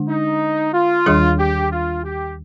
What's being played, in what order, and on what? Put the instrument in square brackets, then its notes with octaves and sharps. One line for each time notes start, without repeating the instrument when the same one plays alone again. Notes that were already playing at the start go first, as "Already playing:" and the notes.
Already playing: [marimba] D3 G#3 D4
[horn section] D#4
F4
[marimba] D#2 D#3 G3 D4 G#4
[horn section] G4
F4
G4